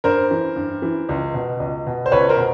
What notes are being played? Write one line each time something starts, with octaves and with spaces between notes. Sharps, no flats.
G2 A#4 C5
E3
G2
E3
C#2
B2
C#2
B2
C5
C#2 B4 C#5
A#4 C5
B2